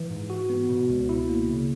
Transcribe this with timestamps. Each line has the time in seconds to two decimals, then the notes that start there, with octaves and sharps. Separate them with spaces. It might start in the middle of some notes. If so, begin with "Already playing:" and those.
Already playing: E3
0.10 G#2
0.30 F#4
0.50 B3
0.69 B2
0.89 C#2
1.09 E4
1.29 A#3
1.49 C#3